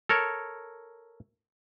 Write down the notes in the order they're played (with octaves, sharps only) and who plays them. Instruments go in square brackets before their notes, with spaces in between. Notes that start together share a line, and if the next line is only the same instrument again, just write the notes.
[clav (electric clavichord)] A4 A#4 C#5